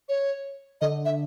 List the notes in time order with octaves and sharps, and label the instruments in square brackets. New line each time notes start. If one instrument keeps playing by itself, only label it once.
[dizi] C#5
[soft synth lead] D3 [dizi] D#5
[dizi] E5